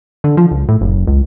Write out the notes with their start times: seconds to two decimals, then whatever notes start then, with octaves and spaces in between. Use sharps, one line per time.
0.24 D3
0.37 F3
0.51 C#2
0.68 A2
0.81 F#1
1.07 C#2